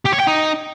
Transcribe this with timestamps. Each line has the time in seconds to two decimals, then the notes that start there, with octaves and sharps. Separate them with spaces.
0.05 G4
0.12 C#5
0.20 G5
0.27 D#4